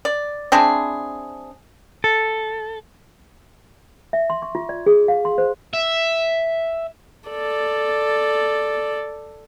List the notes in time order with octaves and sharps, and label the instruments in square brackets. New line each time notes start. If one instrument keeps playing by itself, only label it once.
[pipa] D5
C4 D4 E4 G#4
[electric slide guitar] A4
[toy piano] E5
C6
C#6
F4
D5
G#4
F5
C6
C5
[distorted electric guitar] E5
[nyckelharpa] A4 D5